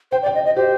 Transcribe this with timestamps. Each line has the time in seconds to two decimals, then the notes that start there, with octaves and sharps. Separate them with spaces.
0.12 C5 G5
0.22 D5
0.26 G5
0.34 D#5
0.45 D#5
0.56 G4 C5